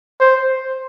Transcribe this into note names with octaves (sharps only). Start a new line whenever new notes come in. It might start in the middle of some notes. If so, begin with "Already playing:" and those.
C5